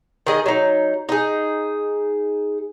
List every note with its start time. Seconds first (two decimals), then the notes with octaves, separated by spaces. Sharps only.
0.27 D#3 G#4 D#5
0.46 F#3 D#4
1.09 D#4 G#4